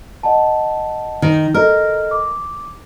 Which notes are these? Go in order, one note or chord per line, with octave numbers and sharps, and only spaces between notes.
D#5 F#5 A5
D#3
A4 A#4 D#5 F6
D6